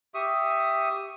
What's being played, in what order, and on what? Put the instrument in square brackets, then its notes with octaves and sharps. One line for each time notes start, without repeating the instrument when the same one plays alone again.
[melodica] G4 E5 C#6 D#6